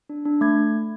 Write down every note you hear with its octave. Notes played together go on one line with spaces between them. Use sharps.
D4
D4
A3 G#6